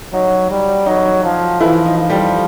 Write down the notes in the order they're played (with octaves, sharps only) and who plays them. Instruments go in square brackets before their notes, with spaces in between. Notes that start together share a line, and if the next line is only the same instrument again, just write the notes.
[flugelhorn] F#3 [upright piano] D#4
[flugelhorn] G3
[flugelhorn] F#3 [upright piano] D#4
[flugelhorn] F3
[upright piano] E3 E4 [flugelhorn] F3
[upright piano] D#4
[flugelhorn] F3
[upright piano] G3 G4